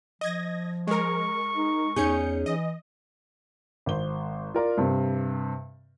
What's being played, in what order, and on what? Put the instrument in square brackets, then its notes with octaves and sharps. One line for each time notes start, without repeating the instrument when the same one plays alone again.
[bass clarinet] F3 [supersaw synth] D#5 G#6 A#6
[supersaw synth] G#3 A#4 [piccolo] C#6
[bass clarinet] D#4
[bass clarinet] E2 [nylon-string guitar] C#4 D#4 G#4 [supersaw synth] G6 C#7
[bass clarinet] E3 [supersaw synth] D#5
[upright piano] G#1 C5 G7
F4 A#4 D5
G2 C3